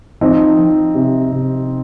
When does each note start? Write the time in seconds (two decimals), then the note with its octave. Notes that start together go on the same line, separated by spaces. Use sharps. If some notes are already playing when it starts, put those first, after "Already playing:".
0.21 F3 C4 D#4
0.58 F3
0.94 C3
1.32 C3